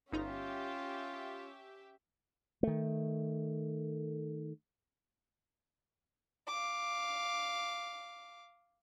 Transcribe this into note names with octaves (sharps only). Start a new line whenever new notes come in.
G1 C#4 D#4 F4 G4 E5 A#5
D#3 A3
F5 D6